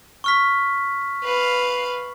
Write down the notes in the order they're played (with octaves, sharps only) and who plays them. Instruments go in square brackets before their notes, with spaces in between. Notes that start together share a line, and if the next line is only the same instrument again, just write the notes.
[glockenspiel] C#6 F6 B6
[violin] B4 F5